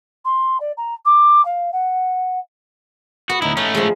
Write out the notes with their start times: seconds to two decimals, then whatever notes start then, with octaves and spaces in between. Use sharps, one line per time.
0.25 C6
0.60 D5
0.77 A#5
1.05 D6
1.45 F5
1.72 F#5
3.30 B3 F#4
3.42 D2 D#4 E4
3.57 A3 C#4 F5
3.75 F3 G#3